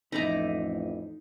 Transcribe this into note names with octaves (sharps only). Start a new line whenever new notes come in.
A1 F2 D#4 E4 D5 D#5 A#5